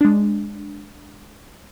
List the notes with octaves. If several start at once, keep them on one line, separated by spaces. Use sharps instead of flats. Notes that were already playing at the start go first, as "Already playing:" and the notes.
G#3 D4